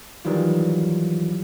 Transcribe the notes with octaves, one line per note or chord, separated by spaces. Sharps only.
D#3 E3 F#3 G3 F4